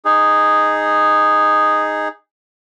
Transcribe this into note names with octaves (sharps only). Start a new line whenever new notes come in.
D#4 G#4